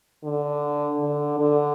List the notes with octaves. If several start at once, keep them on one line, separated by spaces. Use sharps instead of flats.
D3
D3
D3